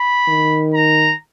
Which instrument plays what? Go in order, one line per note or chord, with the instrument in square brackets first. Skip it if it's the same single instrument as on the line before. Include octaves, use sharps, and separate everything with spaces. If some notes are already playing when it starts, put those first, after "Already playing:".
Already playing: [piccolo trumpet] B5
[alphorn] D#3
[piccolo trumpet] A#5